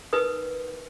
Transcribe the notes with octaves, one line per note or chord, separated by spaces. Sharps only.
D#4 A#4 B4 D#6